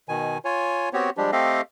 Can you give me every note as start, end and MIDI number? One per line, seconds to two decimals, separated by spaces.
0.09 0.38 47
0.09 0.38 51
0.09 0.38 80
0.45 0.89 65
0.45 0.89 73
0.45 0.89 80
0.93 1.10 59
0.93 1.10 60
0.93 1.10 66
0.93 1.10 67
0.93 1.10 73
1.17 1.31 53
1.17 1.31 55
1.17 1.31 56
1.17 1.31 62
1.17 1.31 67
1.32 1.61 57
1.32 1.61 60
1.32 1.61 67
1.32 1.61 69
1.32 1.61 75
1.32 1.61 77